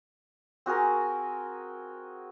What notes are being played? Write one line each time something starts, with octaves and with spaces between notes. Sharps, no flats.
C4 F#4 G#4 A#4